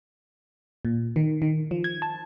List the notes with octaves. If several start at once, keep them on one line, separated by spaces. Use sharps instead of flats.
A#2
D#3
D#3
F3
G#6
A5